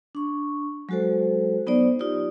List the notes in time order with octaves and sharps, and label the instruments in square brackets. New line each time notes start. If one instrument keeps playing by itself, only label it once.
[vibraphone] D4 C#6
F#3 G#3 F#4 A4 C5
F#3 B3 D#4 C5 D5
D#4 F4 G4 D5